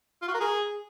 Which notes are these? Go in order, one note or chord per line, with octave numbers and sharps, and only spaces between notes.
F4
F#4
A#4
G#4